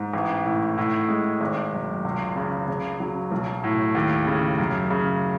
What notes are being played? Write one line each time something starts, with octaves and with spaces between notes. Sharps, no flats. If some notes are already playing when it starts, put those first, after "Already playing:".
Already playing: G#2
A1
A2
A2
G#3
G#1
F#2
C#2
C#3
C#3
F#3
B1
A2
D#2
C#3
F#2
C#3